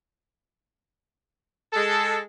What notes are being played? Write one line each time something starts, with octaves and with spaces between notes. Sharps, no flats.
G#3 A4